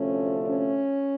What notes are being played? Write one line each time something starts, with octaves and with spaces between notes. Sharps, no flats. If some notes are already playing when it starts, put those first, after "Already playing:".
Already playing: D2 C3 F3 A3 C#4
C#4